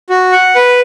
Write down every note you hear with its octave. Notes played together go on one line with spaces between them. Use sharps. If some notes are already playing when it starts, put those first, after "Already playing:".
F#4
F#5
B4